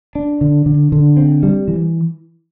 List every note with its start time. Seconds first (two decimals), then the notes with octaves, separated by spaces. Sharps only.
0.15 D4
0.41 D3
0.66 D3
0.92 D3
1.17 C4
1.43 G3
1.68 E3